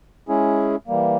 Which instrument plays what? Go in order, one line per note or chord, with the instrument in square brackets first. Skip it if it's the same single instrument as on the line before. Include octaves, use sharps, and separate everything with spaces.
[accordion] G#3 C#4 E4 G#4
E3 G3 A#3